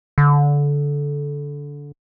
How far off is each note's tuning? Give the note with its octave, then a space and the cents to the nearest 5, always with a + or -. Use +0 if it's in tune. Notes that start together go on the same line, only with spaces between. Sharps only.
D3 -20